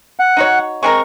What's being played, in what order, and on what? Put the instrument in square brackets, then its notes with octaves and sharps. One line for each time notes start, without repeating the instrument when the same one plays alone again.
[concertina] F#5
[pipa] D#4 F#4 C#5
[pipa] G#3 C4 A#4 [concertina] C#6